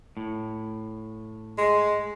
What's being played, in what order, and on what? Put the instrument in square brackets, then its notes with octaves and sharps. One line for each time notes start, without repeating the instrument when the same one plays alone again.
[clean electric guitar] A2
[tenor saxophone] G#3